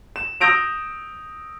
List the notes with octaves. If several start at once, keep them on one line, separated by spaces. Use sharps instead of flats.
E7
D#6 E6 G6 A#6 D7 F7